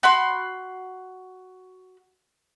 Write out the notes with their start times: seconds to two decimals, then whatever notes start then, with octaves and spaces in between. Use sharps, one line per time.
0.03 F#4 B5 C6